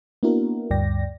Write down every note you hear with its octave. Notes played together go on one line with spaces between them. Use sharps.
A#3 B3 D4 E4 F#4 A#4
D2 G2 D5 G5 A#6